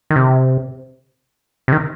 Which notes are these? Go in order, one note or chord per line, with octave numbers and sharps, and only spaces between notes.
D#3
C3
C3
D#3